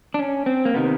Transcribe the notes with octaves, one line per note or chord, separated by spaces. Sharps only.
D4
C#4
C4
A#3
C3 D#3 B3